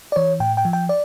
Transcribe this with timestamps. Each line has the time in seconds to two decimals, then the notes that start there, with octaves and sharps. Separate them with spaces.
0.12 D5
0.16 E3 C#5
0.40 A2 G5
0.57 G5
0.65 F3
0.73 G5
0.89 D5